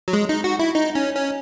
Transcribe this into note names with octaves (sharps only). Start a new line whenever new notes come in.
F#3
G#3
D#4
F#4
E4
D#4
C#4
C#4